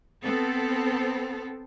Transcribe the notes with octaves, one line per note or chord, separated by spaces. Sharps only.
B3 C4 A4